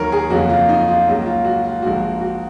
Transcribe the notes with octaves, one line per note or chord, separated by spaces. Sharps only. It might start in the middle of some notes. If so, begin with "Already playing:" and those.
Already playing: D#2 D#3 F#3 A#4 C#5
G#4
F2 C#3 F#3 A#3 F#4
F4
D#4
F4
C#2 C#3 F#3 A#3
F4
F#4
F4
A#1 G#2 F3 A#3 F#4
F#4